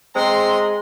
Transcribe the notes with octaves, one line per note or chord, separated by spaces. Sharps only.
G#3 C4 A#5 C6